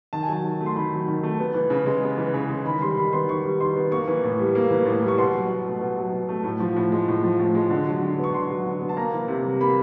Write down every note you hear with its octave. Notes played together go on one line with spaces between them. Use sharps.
D#3 A5
G#5
F#3 A5
D#3
A3
C6
D#3 B5
F#3
D#3
A3
B3
E3
C#3
G#3
B3
E3
C#3
G#3
D#3 B5
G3 C6
D#3 B5
B3 C6
D#3 C#6
G3
D#3 C6
B3
A#3 C#6
E3
A2
G3
A#3
E3
A2
G3
C#6
B2 C6
F#3
B2
A3
B2
F#3
B2
A3
A2
F3
A2
G#3
A2
F3
A2
G#3
D3
F#3
D3
B3
C#6
D3 C6
F#3
D3
B3
A5
A#3 A#5
E3
C3
G3
A#3 B5